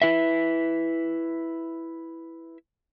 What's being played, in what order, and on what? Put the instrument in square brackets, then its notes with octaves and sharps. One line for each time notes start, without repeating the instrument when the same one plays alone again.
[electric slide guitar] E4 B4 E5